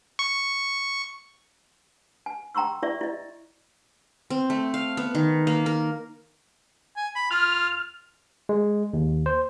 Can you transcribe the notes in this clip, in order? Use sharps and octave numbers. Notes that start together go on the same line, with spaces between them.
C#6
G#5
G5 A#5 C6 C#6 E6
E4 D5 E5 C#6
E4 D#5
C4
A3
F5
B3
D#3
A#3
A#4
G#5
B5
F4 F6
G#3
D#2
C5